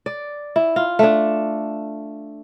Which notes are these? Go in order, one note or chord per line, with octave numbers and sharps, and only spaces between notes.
D5
E4
F4
A3 D4